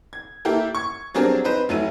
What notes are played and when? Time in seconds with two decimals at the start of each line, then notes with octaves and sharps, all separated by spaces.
0.13 G#6
0.45 A#3 E4 G4 A4 A#4
0.75 C#6 G#6
1.14 F#3 G3 C4 D4 G#4 A#4
1.44 C4 D#4 B4 C5
1.69 F1 F#3 A3 E4 D#7